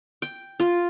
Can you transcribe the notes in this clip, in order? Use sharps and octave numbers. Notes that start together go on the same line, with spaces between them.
G5
F4